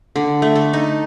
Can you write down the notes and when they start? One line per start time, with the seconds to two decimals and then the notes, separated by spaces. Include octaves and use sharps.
0.16 D3
0.42 A3
0.56 A4
0.73 D#4